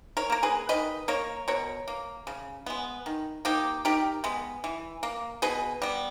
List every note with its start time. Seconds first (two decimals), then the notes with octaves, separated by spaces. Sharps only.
0.17 A#4 C#5
0.30 A#3 A#4
0.43 G#4 B4
0.69 D#3 B4 D#5
1.08 A#3 A#4 C#5
1.48 B2 A#4 C#5
1.88 A#3
2.27 C#3
2.66 G#3 B3
3.06 D#3
3.45 A#3 D#4 G4
3.85 D#3 G4 A#4
4.24 G#3 B3
4.64 E3
5.03 A#3
5.42 B2 G#4 B4
5.82 G3 B3